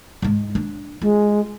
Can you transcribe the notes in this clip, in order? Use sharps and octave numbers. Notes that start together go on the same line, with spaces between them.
G#2 G#3
D4
G#3 F4